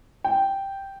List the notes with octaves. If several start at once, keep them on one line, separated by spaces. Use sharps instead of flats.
G5